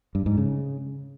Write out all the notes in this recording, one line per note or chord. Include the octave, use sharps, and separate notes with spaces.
G2
G#2
C#3